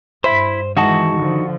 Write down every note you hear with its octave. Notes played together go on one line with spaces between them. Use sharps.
G2 E4 C5 B5
D#3 E3 G#3 D#4 F#4 A5
D3 F3